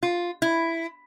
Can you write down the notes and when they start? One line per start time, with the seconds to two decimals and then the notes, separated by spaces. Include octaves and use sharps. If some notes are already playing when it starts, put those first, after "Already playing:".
0.03 F4
0.42 E4